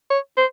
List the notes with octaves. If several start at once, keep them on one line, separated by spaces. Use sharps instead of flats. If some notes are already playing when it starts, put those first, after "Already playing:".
C#5
C5